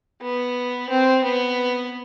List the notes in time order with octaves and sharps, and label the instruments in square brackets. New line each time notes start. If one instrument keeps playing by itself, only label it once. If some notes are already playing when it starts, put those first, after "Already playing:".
[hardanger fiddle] B3
C4
B3